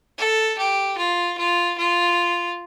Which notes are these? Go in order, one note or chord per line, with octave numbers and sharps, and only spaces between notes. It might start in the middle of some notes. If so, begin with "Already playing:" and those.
A4
G4
F4
F4
F4